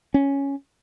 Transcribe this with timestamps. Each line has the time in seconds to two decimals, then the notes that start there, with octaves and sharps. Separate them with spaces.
0.14 C#4